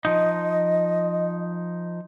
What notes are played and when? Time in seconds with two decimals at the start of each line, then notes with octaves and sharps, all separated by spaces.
0.05 F3 D#4 D#5